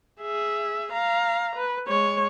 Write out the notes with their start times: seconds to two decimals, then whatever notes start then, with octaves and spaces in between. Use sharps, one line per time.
0.21 G#4 E5
0.92 F5 A#5
1.56 B4
1.88 G#3 C#5